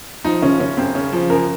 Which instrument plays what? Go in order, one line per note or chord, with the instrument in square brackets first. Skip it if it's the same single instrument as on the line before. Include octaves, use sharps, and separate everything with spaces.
[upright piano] F3 [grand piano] D#4
[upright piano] C#3 [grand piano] C#4
[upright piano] C#3 [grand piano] C#4
[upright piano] F#2 [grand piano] C4
[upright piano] C#3 [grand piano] C#4
[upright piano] F3
[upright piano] F#2 [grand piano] A#4